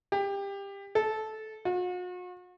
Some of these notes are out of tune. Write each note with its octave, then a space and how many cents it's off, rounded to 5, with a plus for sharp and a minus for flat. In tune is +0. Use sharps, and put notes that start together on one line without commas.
G4 +20
A4 -15
F#4 -45